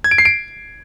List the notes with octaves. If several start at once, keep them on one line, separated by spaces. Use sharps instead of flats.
G#6
D7
C7
D7